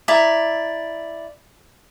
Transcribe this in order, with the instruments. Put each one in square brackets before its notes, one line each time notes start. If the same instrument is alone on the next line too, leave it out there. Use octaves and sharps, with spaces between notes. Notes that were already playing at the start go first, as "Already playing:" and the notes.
[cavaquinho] E4 D5 A#5